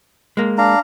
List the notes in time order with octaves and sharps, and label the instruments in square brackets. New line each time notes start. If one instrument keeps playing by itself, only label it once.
[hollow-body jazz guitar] G#3 A#3
[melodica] D4 F5 A#5